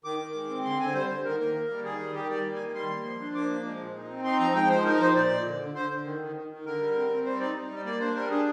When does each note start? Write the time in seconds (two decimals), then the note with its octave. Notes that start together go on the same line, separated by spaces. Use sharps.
0.04 D#3 D6
0.19 D#3
0.35 G#3
0.50 C4
0.64 D3 C6
0.79 D3 G#5
0.94 G3 C5
1.10 D3
1.25 D#3 A#4
1.40 A#3 A#4
1.55 A#3
1.70 G3
1.84 D#3 G#4
2.00 G3
2.14 D#3 G4
2.29 G3 D5
2.44 A#3
2.55 G#5
2.59 D#3
2.74 G3 C6
2.89 A#3
3.04 F3
3.20 D4
3.35 A#3 D6
3.50 F3
3.65 G#3
3.80 A#2
3.95 D#4
4.10 C4
4.24 D#4 C6
4.39 F3 A#5
4.55 G#3 G5
4.69 F3 C5
4.84 D#4 A#4
5.00 F3 C5
5.15 A#2 D5
5.30 A#2
5.45 D3
5.61 D3
5.75 D3 C5
5.90 D3
6.05 D#3
6.21 D#3
6.36 D#3
6.50 D#3
6.65 D3 A#4
6.80 G3
6.96 C4
7.10 C4
7.25 G3 C5
7.40 D#4 D5
7.55 D#4
7.71 G3 D5
7.85 A#3 D5
8.00 D4 C5
8.15 G3 A#4
8.30 D4 G#4